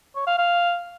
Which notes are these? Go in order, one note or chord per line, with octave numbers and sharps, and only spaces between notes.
C#5
F5
F5